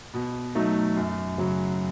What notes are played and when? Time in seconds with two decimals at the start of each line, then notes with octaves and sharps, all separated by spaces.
0.14 B2
0.55 F#3 A3 D#4
0.97 F#2
1.38 C#3 F#3